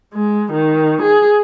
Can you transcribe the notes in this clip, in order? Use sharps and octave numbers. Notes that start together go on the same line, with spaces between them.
G#3
D#3
G#4